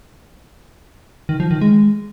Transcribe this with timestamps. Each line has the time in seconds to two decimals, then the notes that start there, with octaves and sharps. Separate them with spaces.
1.29 D#3
1.40 F3
1.51 D#3
1.61 G#3